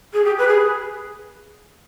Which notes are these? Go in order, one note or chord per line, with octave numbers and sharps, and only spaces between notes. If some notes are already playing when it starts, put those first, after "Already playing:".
G#4
G4
B4
G#4